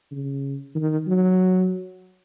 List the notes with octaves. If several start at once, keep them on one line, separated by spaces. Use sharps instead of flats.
C#3
D#3
F#3